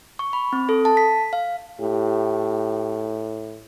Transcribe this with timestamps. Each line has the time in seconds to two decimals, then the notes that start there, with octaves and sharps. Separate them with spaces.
0.19 C#6
0.33 B5
0.53 C4
0.69 A4
0.85 A5
0.97 B6
1.33 F5
1.81 A2 G4